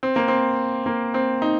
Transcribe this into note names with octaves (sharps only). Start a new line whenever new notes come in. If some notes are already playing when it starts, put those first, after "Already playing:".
C4
A#3
C4
A#3
C4
D#4